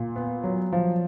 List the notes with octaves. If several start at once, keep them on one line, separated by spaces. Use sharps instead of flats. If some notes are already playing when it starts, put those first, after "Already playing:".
Already playing: A#2
B3
F#3
F3